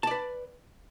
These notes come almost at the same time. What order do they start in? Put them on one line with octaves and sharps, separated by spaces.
A5 D5 B4